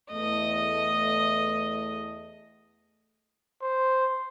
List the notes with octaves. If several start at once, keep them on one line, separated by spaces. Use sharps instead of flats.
E2 A3 D#5
C5